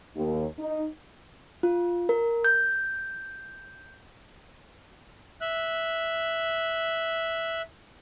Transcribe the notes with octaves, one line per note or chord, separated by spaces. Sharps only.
D#2
D#4
F4
A#4
G6
E5 F#6